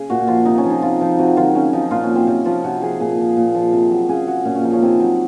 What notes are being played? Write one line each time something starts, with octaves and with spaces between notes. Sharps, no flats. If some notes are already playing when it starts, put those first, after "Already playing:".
Already playing: C#3 G#4
A#2 F#4
F3 F4
C3 D#4
C#4
F3
D#4
C3 F4
F3 D#4
C3 F#4
D#3 F#3 F4
C#3 C#4
F3 D#4
A#2 F4
C#4
F#3
C4
C3 C#4
F3 F4
C3 F#4
F3 G#4
A#2 G#4
F3
A#2
F3
C3
F#3
C#3 G#4
F#3 F#4
A#2 C#4
C#4
F3 D#4
C#4
C3 C4
F#3